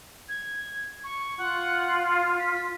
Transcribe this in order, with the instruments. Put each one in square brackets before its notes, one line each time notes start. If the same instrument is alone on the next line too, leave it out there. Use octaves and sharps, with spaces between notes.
[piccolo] G#6
C#6
[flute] F4 [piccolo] F#5
[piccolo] F5
B6